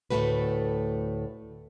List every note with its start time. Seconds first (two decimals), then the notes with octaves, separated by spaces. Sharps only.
0.10 D2 A2 E3 A3 F#4 B4